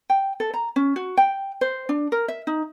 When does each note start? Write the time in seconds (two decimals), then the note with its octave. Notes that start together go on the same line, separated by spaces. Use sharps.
0.10 G5
0.40 A4
0.54 A#5
0.76 C#4
0.96 F#4
1.17 G5
1.61 C5
1.89 D4
2.12 A#4
2.28 E5
2.47 D#4